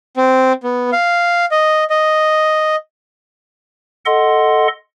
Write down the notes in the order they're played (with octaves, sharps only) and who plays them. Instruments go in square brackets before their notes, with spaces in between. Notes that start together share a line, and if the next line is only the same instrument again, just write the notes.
[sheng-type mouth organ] C4
B3
F5
D#5
D#5
[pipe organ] A4 D#5 F#5 C6